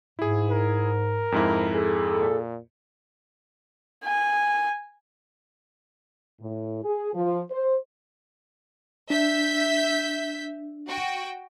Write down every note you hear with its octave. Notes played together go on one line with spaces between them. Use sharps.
G#2 E4 G#4
A#4
F2 G#2 E4
G#4 A4
A#2
G#5
A2
G#4
F3
C5
D4 E5 G6 B6
F#4 G5